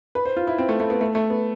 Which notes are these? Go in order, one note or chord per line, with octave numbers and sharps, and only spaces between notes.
B4
C5
F4
E4
C4
A3
A3
B3
A3
A3
B3